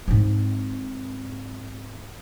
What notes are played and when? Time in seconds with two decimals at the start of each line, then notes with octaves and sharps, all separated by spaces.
0.08 G#2 C4